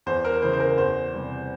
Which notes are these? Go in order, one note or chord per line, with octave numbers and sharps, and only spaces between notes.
E2 C5
A#4
C#3 E3 C5
C5
A#4
E2 C5
C3 G3 C4